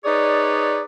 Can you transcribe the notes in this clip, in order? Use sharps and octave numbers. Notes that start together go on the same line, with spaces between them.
D#4 G#4 B4 C#5 D5